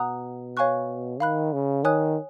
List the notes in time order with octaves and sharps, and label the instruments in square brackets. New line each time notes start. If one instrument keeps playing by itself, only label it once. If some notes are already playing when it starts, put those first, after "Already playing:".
Already playing: [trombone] B2 [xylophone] F#5 A#5 D#6 F#6
[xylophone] C#5 F5 G#5 C#6 F#6
[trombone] D#3 [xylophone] F5 B5 F#6
[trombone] C#3
[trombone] D#3 [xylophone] C#5 G#5 D#6 F#6